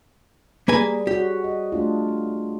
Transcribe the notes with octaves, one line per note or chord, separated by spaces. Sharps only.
G3 A#3 G#4 B4 G#5
C#4 F#4 G4
D#5
A3 D4 F4